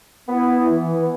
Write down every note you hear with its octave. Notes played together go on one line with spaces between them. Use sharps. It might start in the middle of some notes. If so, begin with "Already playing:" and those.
B3
E4
E3
B3